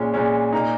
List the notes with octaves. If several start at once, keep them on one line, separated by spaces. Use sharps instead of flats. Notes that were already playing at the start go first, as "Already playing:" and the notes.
Already playing: A#2 G#3 C#4
A#2 G#3 C#4
A#2 A#3 D#4